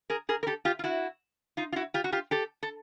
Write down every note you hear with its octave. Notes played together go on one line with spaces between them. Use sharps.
G#4 A#4
G#4 A#4
A#4
G4 A4
F4 G4
F4
E4 F#4
D#4 F4
F4
E4 F#4
F4 G4
F#4
F4 G4
G4 A4
A4